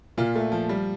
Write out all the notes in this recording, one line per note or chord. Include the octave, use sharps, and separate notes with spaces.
A#2 F4
A3
F3
G3